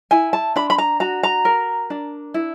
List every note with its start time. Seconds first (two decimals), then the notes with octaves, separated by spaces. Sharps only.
0.11 E4 G#5
0.33 A5
0.56 D4 B5
0.70 B5
0.78 A#5
1.00 F#4 A#5
1.23 A#5
1.45 A#4
1.90 D4
2.34 E4